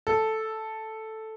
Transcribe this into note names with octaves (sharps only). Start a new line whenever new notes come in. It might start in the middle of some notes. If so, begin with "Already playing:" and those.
A4